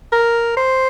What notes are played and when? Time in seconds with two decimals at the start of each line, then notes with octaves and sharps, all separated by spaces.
0.12 A#4
0.57 C5